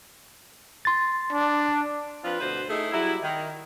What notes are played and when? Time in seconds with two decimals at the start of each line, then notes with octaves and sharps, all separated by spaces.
0.85 C6 A6
1.33 D4
2.24 F3 C4 D4 F4 B4
2.40 D2 B2 B4 C5
2.69 A3 D#4 E4 G#4
2.93 F#3 G3 E4
3.23 D#3